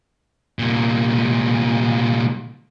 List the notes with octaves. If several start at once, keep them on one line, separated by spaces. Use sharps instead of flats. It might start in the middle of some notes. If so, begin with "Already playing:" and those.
C2 A#2